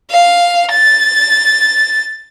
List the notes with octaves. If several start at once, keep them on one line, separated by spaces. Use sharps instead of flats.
F5
A6